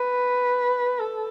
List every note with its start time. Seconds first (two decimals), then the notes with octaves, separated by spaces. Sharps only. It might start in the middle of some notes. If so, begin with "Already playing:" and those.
Already playing: B4
1.00 A4